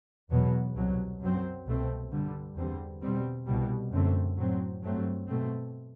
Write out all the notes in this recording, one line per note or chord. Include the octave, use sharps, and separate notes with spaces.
E2 B2 F#3 B3
C2 B2 F#3
F#2 F#3 C4
C2 B2 A3 C4
G2 D3 G3
E2 D3 G3 C4
B2 G3 C4
C2 B2 G3
F#2 D3 A3 C4
A2 F#3 C4
G2 F#3 A3 C4
B2 A3 C4